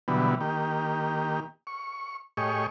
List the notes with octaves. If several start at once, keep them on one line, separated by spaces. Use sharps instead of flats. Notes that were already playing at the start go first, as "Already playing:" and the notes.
B2 D3 E3 F#3 G3 B3
D#3 A#3 G4
C#6
A2 G4 G#4 C#5 D#5 C#6